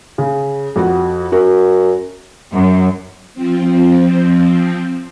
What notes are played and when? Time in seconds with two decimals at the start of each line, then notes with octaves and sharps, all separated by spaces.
0.18 C#3
0.76 F2 F#4 F#5
1.32 F#2 F#4
2.53 F#2
3.34 F3 C4